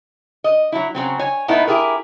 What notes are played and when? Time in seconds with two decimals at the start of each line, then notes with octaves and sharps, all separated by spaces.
0.44 D#5
0.72 F#3 E4
0.95 C#3 F#3 C4
1.19 C#5 G#5
1.48 A2 A3 B3 D#4 E4
1.67 E4 G4 G#4 A#4